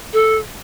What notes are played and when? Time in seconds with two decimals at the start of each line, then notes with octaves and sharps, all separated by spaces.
0.13 A4